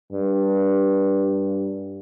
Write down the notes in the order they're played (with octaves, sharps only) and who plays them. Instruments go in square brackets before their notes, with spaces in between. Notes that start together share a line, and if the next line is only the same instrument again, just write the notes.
[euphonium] G2